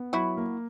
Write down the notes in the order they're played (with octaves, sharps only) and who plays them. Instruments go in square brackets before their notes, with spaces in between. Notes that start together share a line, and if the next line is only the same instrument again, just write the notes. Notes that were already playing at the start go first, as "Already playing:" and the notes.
Already playing: [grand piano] B3
[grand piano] F#3 [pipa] E4 F#4
[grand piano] A#3